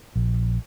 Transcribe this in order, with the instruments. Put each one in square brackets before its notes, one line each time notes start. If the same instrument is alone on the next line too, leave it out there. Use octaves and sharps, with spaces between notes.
[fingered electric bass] A#1